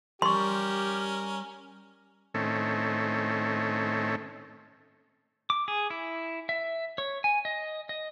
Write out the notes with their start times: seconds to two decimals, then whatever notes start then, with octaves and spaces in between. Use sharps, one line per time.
0.22 G3 C#4 G4 A#4 C6 C#6
2.34 A2 D#3 A3 C4 C#4
5.50 D6
5.68 G#4
5.90 E4
6.49 E5
6.98 C#5
7.24 G#5
7.45 D#5
7.89 D#5